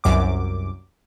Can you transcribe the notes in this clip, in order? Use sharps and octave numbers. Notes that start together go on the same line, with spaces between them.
C2 F#2 D6